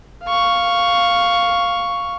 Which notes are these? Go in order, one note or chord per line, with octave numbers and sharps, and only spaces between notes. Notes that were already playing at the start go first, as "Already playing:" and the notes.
F5 C#6